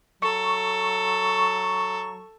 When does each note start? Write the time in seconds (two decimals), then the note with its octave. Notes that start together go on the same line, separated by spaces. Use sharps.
0.22 F#3 A4 C#6